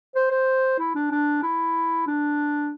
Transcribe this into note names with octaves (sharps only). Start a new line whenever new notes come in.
C5
C5
E4
D4
D4
E4
D4